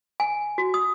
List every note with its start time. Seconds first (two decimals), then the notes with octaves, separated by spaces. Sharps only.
0.20 G#5
0.58 F#4
0.74 D#6